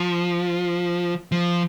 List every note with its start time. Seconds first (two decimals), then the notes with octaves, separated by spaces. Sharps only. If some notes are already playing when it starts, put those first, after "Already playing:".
Already playing: F3
1.32 F3